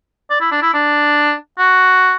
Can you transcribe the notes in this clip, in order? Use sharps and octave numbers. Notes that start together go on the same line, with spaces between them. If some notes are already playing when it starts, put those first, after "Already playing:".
D5
E4
D4
E4
D4
F#4